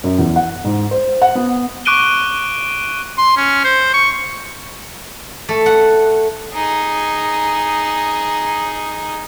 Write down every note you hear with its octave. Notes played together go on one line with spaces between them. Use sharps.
F#2
E2
F#5
G#2
C5
F#5
B3
C#6 D6 F#6 D7 D#7 G7
C6
C#4
C5
C#6
A3
F#5
D#4 G#4